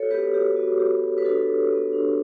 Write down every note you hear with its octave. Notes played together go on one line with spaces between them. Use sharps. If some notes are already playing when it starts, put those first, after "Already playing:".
Already playing: F#4 A4 C#5
B3 G4 B4
F#4 G4
B3 F#4
B3 G4
F#4
B4
D4 F#4 A4
F#4
B3
D4